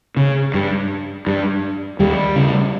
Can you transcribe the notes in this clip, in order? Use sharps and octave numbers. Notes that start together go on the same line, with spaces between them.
C#3
G2
G2
D#2 G3
C#3